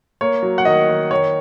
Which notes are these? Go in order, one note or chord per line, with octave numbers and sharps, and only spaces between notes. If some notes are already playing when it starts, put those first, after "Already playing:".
A#3 C#5
F#3
F#5
D#3 D#5
D#3
D#3 C#5